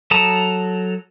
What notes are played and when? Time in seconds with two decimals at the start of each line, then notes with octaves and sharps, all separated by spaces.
0.11 F#3 A4 A5 A#5 D#6